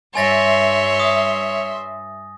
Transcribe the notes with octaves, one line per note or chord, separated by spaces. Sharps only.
G2 C#5 E5 G#5 C6 A6 A#6
D#6